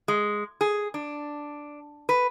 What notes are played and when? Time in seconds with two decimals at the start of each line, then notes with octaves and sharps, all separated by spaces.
0.08 G#3
0.61 G#4
0.94 D4
2.09 B4